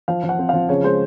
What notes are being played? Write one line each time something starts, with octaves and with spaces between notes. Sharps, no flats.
F3 F5
F3
F#5
C4
F3 F5
C#3 C#5
G#3 C5